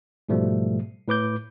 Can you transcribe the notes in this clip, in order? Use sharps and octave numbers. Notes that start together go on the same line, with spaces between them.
G#2 B2 F3 G3 A3
A2 B4 D6 G6